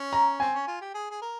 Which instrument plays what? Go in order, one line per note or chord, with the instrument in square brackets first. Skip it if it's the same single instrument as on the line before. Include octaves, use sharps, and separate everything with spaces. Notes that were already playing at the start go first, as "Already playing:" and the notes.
Already playing: [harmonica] C#4
[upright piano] A#5
[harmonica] C4 [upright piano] G#5
[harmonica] C#4
F4
G4
G#4
G#4
A#4